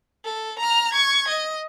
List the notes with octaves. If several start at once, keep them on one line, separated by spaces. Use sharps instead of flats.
A4
A#5 F6
C#6 G#6
D#5